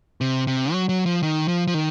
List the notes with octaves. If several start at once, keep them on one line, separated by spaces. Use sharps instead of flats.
C3
C3
F#3
F#3
F3
D#3
F3
F3
D#3